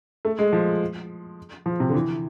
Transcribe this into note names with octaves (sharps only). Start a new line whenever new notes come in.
A3
G#3
F3
F3
C3
D3
E3